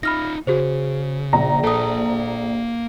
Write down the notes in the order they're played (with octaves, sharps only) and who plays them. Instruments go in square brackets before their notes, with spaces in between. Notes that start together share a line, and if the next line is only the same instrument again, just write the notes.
[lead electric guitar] D#4 F4 [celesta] B5 F6 A#6
[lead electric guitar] C#3 [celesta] F#4 G#4 C5
[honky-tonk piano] A#1 A#5
[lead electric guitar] A#3 A5 [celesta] A4 D#6